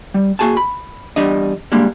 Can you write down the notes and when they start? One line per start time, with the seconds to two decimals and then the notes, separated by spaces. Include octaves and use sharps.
0.14 G3
0.39 A#3 F#4 G#4 G#5 A5
0.57 B5
1.16 E2 G3 D4 D#5
1.72 G3 G#3 A#3 D4